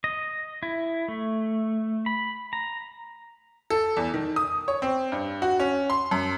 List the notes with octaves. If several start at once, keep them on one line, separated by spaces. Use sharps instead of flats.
D#5
E4
A3
B5
A#5
A4
E2
D#3
D#6
C#5
C4
G2
F#4
C#4
C6
F#2